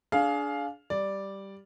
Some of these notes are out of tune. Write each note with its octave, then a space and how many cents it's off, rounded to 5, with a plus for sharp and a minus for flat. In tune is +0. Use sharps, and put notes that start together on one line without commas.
D4 -15 G#4 +20 F5 +5
G3 +0 D5 +0